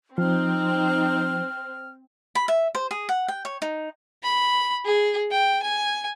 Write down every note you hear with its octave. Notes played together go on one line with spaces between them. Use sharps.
F3 C4 D#4 F6
B5
E5
C5
G#4
F#5
G5
C#5
D#4
B5
G#4
G5
G#5